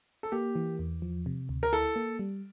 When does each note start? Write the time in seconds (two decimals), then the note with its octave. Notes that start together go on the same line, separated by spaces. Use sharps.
0.23 A4
0.32 A#3 G4
0.55 E3
0.79 E2
1.02 F3
1.26 C3
1.49 D2
1.63 A#4
1.72 E4 A4
1.96 A#3
2.19 G3